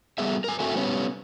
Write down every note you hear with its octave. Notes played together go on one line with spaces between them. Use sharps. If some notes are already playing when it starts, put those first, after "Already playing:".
G3 B3 G#4 E5
A#4 G#5
A3 C4 F#4 A4 E5 G#5
G3 B3 C#4